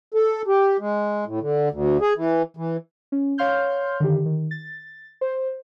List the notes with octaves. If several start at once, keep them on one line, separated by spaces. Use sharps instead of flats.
A4
G4
G#3
A2
D3
D2
G#4
E3
E3
C#4
C#5 F5 C6 F6 G6
D3 D#3 G4
D#3
A6
C5